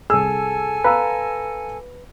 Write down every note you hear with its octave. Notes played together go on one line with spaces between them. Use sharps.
C2 G#4 A4 G#5 E6
B4 F5 A#5 E6